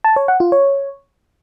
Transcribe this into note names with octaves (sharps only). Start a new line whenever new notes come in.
A5
C#5
F#5
F4
C#5